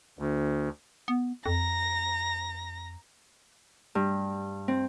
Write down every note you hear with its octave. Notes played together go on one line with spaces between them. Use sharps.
D2
B3
F2 A#5 A#6
G2
C4